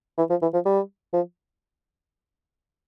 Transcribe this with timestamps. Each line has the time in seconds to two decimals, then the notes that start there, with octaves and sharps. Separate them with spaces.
0.18 E3
0.30 F3
0.42 E3
0.54 F3
0.65 G3
1.13 F3